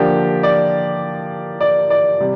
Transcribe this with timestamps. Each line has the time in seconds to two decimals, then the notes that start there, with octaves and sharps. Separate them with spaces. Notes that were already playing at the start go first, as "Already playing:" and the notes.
Already playing: D3 F3 A#3 D4 G4
0.43 D5
1.61 D5
1.90 D5
2.20 C3 G3